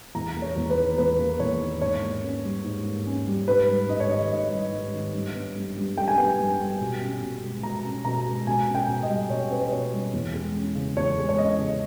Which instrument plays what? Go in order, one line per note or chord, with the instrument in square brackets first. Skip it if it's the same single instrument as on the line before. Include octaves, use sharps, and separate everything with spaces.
[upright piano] E2 A#5
A#3
C#5
E2
B4
D#3
E2 B4
A#3
E2 C#5
D#3
G#2 C#5
A#3
C#4
G3
G#2
A#3
C#4
G3
G#2 B4
G3
G#2 D#5
C#5
D#3 D#5
G#2 D#5
G3
G#2
D#3
G2
B3
G2
G3
G2 G5
G#5
B3 G5
G2
G3
B2
C#4
B2
G#3
B2 A#5
C#4
B2 A#5
G#3
B2 G#5
C#4
G5
B2
D#5
G3
B2 C#5
C#4 B4
B4
B2 C#5
G3
E2
G#3
C#4
C#3
E2 C#5
G#3
C#5
C#4 D#5
C#3